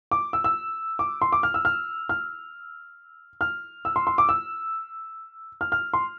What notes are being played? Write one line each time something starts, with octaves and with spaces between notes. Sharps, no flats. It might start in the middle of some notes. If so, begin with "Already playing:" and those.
D6
E6
E6
D6
C6
D6
F6
E6
F6
F6
F6
E6
C6
C6
D6
E6
F6
F6
C6